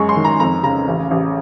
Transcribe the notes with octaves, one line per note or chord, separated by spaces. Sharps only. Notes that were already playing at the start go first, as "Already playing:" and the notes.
Already playing: F#2 G#3 C#6
C6
D#3
A#5
F2 A#5
C#3 A#5
A1
A1